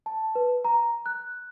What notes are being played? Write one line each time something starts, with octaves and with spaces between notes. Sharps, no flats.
A5
B4
A#5
F#6